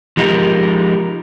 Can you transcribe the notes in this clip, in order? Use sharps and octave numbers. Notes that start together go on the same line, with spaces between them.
F3 G#3 D#4 F4 G4 A#4